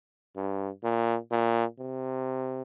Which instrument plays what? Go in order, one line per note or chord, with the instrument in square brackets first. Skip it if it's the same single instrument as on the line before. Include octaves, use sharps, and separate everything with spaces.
[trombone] G2
A#2
A#2
C3